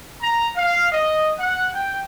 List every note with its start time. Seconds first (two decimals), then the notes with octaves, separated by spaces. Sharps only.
0.22 A#5
0.55 F5
0.91 D#5
1.39 F#5
1.72 G5